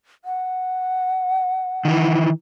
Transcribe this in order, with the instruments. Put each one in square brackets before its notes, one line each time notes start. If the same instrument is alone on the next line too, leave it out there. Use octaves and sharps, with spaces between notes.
[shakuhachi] F#5
[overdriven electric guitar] D#3 E3